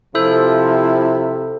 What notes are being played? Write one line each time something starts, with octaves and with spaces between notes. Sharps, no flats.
C3 F3 E4 A4 C5